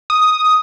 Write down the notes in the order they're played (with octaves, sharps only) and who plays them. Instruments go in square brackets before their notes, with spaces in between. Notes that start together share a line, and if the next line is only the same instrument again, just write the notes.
[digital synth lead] D#6